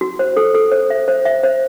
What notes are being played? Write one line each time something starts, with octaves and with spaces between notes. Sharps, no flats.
F#4
C5
A4
A4
C5
E5
C5
E5
C5